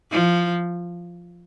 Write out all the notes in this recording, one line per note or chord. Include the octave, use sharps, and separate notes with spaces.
F3